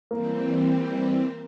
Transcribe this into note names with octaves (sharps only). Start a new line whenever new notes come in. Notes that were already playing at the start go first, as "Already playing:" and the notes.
E3 G3 A#3 C4